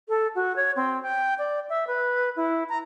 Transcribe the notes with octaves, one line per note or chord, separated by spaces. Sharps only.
A4
F#4
C#5
C4
G5
D5
E5
B4
E4
A#5